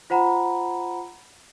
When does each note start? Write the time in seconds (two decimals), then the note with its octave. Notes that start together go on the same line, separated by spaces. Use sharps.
0.10 F4 C5 F#5 A#5 B5